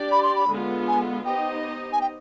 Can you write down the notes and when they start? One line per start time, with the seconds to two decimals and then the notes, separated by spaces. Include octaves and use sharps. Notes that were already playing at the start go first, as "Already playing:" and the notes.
Already playing: D4 G4 D5
0.12 B5
0.23 C6
0.36 B5
0.50 D3 G#3 B3 F4
0.88 G#5
1.25 B3 D#4 G4 C5 D#5 G5
1.93 G#5
2.01 G5